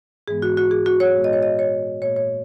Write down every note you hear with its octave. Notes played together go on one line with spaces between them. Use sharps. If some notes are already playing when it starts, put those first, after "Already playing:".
G#2 E3 G#3 B3 G#4
F#4
F#4
G#4
F#4
C#5
A#2 G#3 B3
D#5
C#5
D#5
C#5
A#2 A#3 C#5
C#5